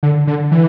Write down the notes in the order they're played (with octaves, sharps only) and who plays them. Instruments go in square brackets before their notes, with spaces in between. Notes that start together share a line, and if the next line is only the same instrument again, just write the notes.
[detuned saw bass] D3
D3
E3